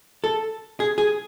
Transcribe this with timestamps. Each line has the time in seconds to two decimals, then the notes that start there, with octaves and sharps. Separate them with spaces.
0.24 A4
0.80 G#4
0.98 G#4